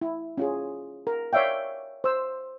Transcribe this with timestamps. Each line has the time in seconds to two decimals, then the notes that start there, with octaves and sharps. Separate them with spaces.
0.01 E4
0.38 C#4 F4 G#4
1.07 A#4
1.33 C#5 D5 E5 F5 G5
2.04 C5 E6